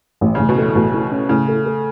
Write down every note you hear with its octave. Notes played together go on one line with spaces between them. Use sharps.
A1
A1 C#3
B2
A2 A3
A1 B2
A2
C#4
A2 C#3
A3
A3